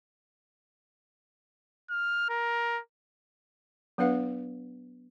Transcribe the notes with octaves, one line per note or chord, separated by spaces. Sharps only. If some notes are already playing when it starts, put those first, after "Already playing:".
F6
A#4
F#3 B3 D4 B4 F5 F#5